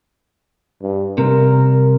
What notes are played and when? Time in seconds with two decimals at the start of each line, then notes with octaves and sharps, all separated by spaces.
0.82 G2
1.18 C2 G2 C3 A#4